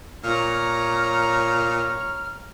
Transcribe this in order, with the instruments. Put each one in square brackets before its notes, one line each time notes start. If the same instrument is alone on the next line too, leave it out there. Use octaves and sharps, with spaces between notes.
[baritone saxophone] A#2 [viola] C#5 A#5 [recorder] F6